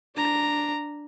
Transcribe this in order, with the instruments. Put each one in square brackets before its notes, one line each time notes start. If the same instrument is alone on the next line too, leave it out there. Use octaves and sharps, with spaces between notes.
[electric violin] D4 A#5